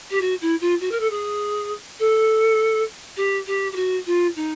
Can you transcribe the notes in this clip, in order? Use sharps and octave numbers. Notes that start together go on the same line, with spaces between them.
G4
F#4
E4
F4
F#4
A#4
A4
G#4
A4
G4
G4
G4
F#4
F4
D#4